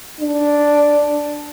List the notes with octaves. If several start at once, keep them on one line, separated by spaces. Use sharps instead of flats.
D4